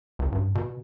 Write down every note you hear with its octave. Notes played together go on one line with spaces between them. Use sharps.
C#2
G2
B2